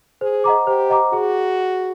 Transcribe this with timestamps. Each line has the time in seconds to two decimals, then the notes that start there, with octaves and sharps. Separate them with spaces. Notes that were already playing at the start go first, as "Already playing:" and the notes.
0.21 G#4 C5
0.44 D#5 F#5 A#5 D6
0.67 G4 C5
0.90 D#5 F#5 A#5 D6
1.13 F#4 G#4